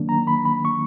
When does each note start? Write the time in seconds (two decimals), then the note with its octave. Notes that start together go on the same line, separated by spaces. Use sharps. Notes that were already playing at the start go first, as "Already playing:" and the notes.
Already playing: D#3 F#3 A#3 D4
0.09 A#5
0.27 B5
0.45 B5
0.65 C#6